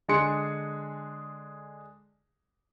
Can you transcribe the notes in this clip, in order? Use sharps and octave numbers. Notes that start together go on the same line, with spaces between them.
D3 G#3 D4 G#4 C6 C#7